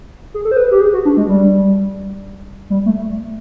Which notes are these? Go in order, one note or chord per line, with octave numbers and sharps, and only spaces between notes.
G#4
A4
C5
B4
G4
G#4
F#4
D4
G#3
G3
G3
A3